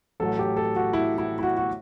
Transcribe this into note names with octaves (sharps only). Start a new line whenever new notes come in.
A1 A2 F#3 A4
G4
A4
F#4
E4
E4
E4
F#4
F#4